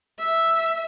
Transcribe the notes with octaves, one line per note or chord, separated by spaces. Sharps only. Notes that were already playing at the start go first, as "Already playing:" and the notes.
E5